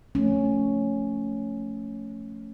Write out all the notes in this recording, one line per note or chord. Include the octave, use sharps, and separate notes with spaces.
F3 A3 C#4